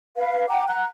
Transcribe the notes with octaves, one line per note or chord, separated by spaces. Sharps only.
B4 F5
F#5 G5 A#5 D6
F#5 A#5 F#6